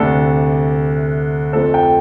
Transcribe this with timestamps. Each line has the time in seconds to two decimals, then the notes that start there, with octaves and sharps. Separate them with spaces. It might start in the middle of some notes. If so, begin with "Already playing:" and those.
Already playing: D2 C3 A3 D4 A4
1.53 F2 F3 A3 C4 A4
1.74 G5